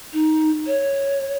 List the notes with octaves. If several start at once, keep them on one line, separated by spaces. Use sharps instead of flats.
D#4
C#5